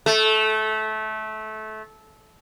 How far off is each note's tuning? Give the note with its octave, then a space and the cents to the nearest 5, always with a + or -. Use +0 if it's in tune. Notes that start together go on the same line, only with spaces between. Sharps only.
A3 -20